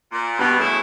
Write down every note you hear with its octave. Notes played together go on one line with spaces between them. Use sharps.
A#2
G2 B2
C#3 A3 E4